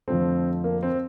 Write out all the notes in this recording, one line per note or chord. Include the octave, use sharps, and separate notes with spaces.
F2 D3 F3 A3 C4
A#3
C4